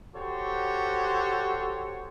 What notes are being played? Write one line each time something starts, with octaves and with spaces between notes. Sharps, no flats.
F#4 G4 A4 C5 C#5